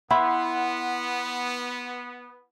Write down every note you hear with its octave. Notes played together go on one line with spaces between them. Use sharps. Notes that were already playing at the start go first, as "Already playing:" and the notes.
B3 E4 F#5 C6